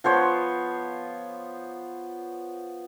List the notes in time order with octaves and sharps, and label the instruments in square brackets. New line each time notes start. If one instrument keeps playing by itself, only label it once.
[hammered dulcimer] F3 B3 C5 C#5